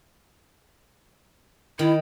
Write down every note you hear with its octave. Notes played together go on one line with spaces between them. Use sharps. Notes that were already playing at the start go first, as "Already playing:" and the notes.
D#3 E4